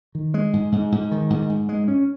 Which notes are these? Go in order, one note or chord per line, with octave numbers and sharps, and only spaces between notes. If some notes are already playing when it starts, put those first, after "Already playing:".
D#3
G#3
G#2
G#2
G#2
D#3
G#2
G#2
G#3
C#4